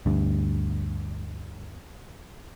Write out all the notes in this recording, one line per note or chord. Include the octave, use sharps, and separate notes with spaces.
D2 G2